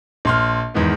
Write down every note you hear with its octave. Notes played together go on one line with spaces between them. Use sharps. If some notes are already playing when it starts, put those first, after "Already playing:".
A#1 C6 F6
E2 G#2 D#3 B3